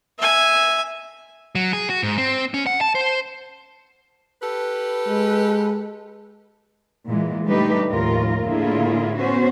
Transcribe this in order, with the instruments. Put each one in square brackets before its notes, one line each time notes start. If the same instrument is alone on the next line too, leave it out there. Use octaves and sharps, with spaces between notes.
[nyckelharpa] E5 G#5
[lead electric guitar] F#3
G#4
F#4
G#2
C4
C#4
F#5
A5
C5
[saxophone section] G4 A4 B4
[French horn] G#3
[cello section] A#2 E3 G#3
D3 G3 A3 D#4 G4 B4
D#2 A2 F3 F4 A#4
A2 D3 A#3 E4 F4 G#4
B3 C#4 F#4 C5